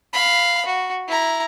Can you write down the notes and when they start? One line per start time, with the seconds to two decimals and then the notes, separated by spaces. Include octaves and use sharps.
0.13 F5 B5
0.66 F#4
1.08 E4 A#5